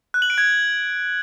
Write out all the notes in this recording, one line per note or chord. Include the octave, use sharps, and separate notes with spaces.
F#6
F#7
D7
G#6